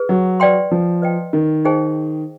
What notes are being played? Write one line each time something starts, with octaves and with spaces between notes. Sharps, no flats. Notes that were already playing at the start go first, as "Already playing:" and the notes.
Already playing: G#4 B4
F#3
B4 D5 G5 C6
F3
B4 D#5 G5
D#3
D#4 G#4 C5 D#5 G5